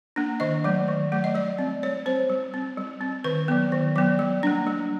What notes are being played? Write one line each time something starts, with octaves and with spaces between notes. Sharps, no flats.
A#3 D4
D#3 D#5
F#3 A3
D#3
F#3 A3
D#5
G3 D5
C4
G3 C#5
C4 C5
G3
C4
G3
C4
D#3 B4
F#3 B3
D#3
F#3 B3
G3
A#3 D4
G3